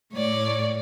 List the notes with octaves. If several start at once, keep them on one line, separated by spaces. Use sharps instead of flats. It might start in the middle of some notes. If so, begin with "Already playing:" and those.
A2 C#5 D5